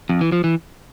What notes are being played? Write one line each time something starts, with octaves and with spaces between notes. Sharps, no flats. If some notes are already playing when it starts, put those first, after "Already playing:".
F2
E3
F3
E3